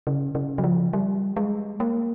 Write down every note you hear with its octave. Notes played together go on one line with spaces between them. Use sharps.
C#3
C#3
F#3
F3
G3
G#3
A#3